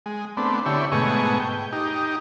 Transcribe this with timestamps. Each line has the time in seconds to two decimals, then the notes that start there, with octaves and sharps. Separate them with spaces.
0.06 G#3
0.37 A3 B3 C4 D4
0.66 D3 E4 G4 C#5
0.92 G#2 B2 A3 D#5 G#5 C#6
1.40 G5
1.73 D#4 G4